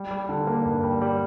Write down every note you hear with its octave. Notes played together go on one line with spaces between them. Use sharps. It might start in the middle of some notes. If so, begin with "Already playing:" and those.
Already playing: G3
G3
D3
A#3
G2
G3
G3